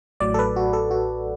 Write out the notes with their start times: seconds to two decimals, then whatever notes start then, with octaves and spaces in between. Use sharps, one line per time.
0.20 A1 A2 F#3 D5
0.34 A4
0.39 B4
0.56 F#4
0.73 A4
0.91 F#4